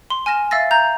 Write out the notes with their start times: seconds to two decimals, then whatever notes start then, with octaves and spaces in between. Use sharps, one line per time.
0.10 C6
0.26 G#5 F6 A#6 E7
0.51 E5 F5 E6 A6 A#6
0.71 A#5 G6 A#6